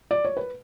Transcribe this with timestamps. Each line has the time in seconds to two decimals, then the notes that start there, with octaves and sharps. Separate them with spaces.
0.11 D5
0.25 C#5
0.37 B4